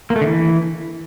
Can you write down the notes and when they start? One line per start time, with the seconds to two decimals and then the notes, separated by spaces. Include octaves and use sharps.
0.10 A#3
0.16 A3
0.21 D3
0.27 E3